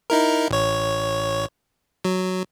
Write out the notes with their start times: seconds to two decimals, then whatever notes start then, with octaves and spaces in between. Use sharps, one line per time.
0.10 D#4 E4 A#4
0.50 A1 C#5
2.05 F#3